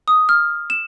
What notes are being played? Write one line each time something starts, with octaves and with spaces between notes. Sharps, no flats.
D#6
F6
E7